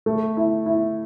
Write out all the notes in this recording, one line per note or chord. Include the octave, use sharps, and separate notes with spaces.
A3
E4
E4